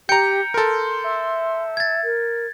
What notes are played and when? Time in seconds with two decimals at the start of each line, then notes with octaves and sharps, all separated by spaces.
0.09 G4 G5 A#5 G6 C#7
0.54 A4 A#4 C6
1.04 E5
1.77 G#6 A6
2.04 A#4